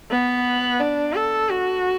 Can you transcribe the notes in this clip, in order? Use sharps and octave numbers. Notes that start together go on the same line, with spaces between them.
B3
D4
A4
F#4